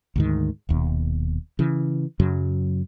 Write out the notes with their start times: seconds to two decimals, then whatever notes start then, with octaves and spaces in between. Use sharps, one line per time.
0.16 D2 G#2 D#3
0.69 D#1 D#2 B2
1.59 C#3 E3
2.20 F#2 C#3 F#3